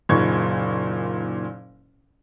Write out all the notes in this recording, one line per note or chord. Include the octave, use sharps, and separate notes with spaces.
F#1 A#2 D#3 C#6 G#6